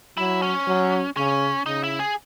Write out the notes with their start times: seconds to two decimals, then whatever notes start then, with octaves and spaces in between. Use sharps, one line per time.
0.17 F#3 E4
0.42 C#4
0.67 F#3
1.17 C#3 C#4
1.66 C#3 D#4
1.84 E4
1.99 G#4